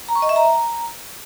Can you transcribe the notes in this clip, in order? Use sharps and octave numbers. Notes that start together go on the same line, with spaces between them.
A#5
C#6
D#5
E5
A#5